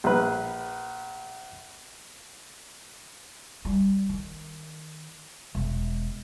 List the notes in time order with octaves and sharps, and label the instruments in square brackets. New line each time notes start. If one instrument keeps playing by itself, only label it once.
[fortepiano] A#1 B4
[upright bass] G3
D#3
E1